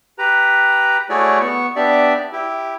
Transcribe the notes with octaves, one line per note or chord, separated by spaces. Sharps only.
G4 B4 A#5
A3 E4 F#4 G#4 C#5 D5
B3 C#6
B3 D4 G4 D5 E5
E4 G4